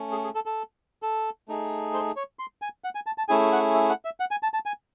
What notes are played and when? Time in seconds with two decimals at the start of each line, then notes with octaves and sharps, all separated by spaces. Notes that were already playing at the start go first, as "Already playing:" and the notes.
Already playing: A3 C#4
0.12 G#4
0.24 G#4
0.35 A4
0.46 A4
1.03 A4
1.48 A3 D#4 G#4
1.94 C5
2.16 C#5
2.39 C6
2.62 G#5
2.84 F#5
2.95 G#5
3.06 A5
3.18 A5
3.29 A3 C#4 E4 G#4 G#5
3.52 F#5
3.74 E5
3.90 F#5
4.05 E5
4.20 F#5
4.31 G#5
4.43 A5
4.54 A5
4.66 G#5